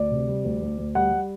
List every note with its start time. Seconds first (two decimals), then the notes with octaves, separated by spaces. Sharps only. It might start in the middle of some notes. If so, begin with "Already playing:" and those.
Already playing: D2 D5
0.11 C3
0.28 G3
0.44 D2
0.62 D2
0.78 D2
0.95 G3 F#5
1.12 G3